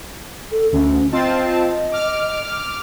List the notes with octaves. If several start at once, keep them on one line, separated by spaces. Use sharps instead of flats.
A4
D2 C#4
C4 F4 D#5 A5
D6 F6